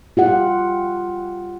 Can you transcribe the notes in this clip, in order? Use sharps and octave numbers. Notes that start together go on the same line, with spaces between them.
F4 G4 F#5